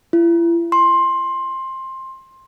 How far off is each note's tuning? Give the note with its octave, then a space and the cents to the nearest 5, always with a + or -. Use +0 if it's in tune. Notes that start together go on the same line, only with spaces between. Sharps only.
E4 +40
C6 +15